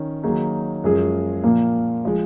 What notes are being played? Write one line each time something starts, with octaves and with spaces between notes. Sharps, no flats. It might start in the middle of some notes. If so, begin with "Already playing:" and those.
Already playing: D#3 C#4
D#3 F#3 A#3 D#4 G#4
F#2 F3 G#3 C#4 G#4
A#2 F3 A#3
F3 G#3